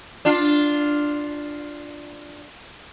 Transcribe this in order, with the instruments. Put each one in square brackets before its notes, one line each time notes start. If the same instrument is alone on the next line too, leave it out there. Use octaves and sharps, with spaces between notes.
[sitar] D4 F4